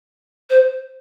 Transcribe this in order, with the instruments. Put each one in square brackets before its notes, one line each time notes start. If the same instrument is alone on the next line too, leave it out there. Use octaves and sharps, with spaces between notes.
[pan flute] C5